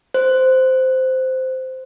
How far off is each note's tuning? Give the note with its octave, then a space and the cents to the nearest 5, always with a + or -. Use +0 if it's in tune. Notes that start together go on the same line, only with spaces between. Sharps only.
C5 -10